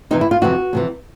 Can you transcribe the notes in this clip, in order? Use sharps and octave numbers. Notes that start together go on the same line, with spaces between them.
F2 C3 E3 D#4
E4
F4
F2 C3 E3 F#4
F2 C3 E3